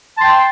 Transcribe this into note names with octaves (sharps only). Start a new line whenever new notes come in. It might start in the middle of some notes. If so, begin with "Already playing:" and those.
G5 A5 C6